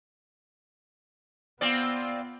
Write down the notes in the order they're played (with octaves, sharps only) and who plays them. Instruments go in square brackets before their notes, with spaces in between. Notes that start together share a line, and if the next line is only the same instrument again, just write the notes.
[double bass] B3 [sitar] C4 F4 D5